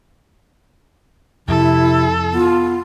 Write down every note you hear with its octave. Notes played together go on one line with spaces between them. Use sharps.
F2 C3 E4 A4
B3 F4